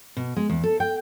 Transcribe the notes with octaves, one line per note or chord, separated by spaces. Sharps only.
B2
G#3
E2
A4
G5